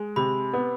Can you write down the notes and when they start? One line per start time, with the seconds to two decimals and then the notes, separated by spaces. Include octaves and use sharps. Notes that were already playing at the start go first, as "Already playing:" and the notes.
Already playing: G#3
0.16 C3 B5
0.53 B3